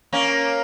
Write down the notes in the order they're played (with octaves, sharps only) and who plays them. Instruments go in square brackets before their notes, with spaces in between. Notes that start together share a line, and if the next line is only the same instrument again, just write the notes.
[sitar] A#3 C#4